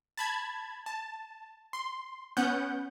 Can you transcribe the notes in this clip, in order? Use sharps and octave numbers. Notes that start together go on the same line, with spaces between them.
A5 B5 G#6
A5
C6
B3 C#4 F#5 G6